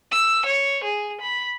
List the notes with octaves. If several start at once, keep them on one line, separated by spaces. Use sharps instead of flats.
E6
C#5
G#4
B5